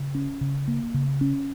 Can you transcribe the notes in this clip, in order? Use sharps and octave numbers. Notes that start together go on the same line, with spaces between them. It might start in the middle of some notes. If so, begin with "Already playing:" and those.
Already playing: C#3
C#4
C#3
A#3
C#3
C#4